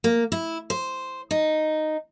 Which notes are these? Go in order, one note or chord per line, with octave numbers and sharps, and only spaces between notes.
A#3
E4
C5
D#4